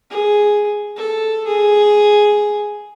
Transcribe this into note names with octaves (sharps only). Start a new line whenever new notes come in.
G#4
A4
G#4